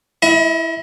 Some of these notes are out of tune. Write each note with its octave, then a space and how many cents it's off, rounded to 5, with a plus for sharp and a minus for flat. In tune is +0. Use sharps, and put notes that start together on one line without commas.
E4 +0 D#5 +40